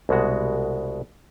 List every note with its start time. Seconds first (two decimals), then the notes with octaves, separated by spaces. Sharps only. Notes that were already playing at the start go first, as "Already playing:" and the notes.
0.09 C2 B2 G#3 F#4